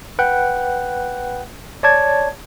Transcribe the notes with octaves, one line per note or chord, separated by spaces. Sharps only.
B4 F#5 G5 F#6
C#5 D5 A5 G#6